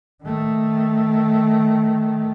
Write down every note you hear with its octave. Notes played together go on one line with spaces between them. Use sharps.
D#3 A3